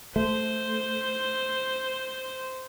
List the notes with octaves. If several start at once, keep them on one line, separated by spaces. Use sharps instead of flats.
A3 C5